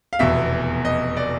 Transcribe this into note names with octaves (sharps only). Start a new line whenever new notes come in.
F5
F1 E2 B2 E5
D#5
D5